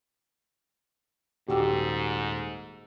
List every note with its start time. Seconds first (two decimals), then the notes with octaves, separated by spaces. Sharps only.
1.49 D#1 G#2 F#4 G4 E6